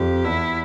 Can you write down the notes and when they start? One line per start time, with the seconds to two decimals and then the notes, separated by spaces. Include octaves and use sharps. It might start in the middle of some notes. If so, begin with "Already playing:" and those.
Already playing: F2 G4
0.25 E2 E4